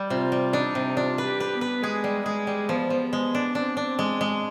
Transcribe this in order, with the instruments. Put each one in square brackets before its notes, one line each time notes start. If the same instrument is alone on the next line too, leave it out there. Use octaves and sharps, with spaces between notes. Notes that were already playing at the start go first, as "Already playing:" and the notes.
Already playing: [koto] G3
[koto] C3 [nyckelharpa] F4
[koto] G3
[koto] D4 [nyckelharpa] D#4
[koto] C3
[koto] D4 [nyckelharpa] F4
[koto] B4
[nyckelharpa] G4
[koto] B4
[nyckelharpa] B3
[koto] B4
[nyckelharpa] G#3 [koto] G#4
[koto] G3
[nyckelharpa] G#3 [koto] G#4
[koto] G3
[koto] F3 [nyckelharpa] B3
[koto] F3
G#3
D4
[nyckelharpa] C4 [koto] D4
[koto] D4
[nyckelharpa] C4
[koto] G#3
G#3